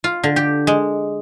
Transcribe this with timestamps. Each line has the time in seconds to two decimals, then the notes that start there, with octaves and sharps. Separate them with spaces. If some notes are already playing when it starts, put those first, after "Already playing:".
0.04 F4
0.24 D3
0.36 G4
0.67 G#3